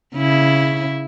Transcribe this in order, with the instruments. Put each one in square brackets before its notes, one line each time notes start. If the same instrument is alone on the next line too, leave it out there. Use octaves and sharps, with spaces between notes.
[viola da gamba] C#3 E4